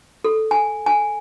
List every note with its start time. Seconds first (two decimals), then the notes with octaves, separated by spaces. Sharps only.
0.24 A4
0.51 G#5
0.86 G#5